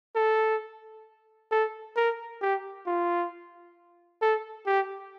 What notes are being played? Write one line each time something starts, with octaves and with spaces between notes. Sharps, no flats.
A4
A4
A#4
G4
F4
A4
G4